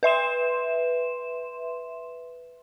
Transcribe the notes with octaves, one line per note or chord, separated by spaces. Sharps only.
B4 E5 C6 E7